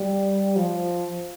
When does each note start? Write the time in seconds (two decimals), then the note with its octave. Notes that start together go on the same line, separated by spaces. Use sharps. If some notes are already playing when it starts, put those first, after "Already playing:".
Already playing: G3
0.56 F3